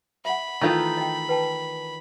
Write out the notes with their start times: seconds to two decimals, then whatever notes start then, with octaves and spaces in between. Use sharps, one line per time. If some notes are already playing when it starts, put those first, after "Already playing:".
0.25 E5 F#5 B5
0.61 D#3 E3 A3 D#4 F4
0.98 D#5 G5
1.29 B4 G5 A5